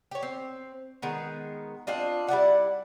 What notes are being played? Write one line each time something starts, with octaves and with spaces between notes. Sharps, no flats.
G4 C#5
C4
D#3 G#3 B3
C4 D4 F4 D#5
G3 E4 D5 F#5